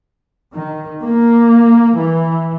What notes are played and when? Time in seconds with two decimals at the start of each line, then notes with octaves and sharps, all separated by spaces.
0.53 D#3
1.02 A#3
1.96 E3